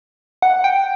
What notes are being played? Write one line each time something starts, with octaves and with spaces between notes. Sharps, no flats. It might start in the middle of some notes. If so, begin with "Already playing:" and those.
F#5
G5